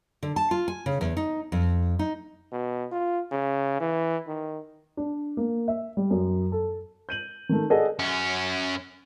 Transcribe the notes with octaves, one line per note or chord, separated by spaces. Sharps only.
D3
A5
F4
G#5
C#3
E2
D#4
F2
D#4
B2
F4
C#3
E3
D#3
D4
A#3
E5
G3
F#2
A4
G6 D#7 F#7
D#3 A3
G#4 A4 D5 D#5 F#5
F#2 C#4